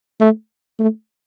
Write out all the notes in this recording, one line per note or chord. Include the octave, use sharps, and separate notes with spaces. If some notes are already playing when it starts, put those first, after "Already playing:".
A3
A3